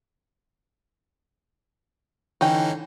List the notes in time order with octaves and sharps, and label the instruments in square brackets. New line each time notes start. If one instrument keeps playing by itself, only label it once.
[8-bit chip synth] D3 E3 D#4 [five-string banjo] C#4 G5